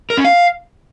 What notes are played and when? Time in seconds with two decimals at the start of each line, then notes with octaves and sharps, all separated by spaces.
0.10 A#4
0.17 C#4
0.25 F5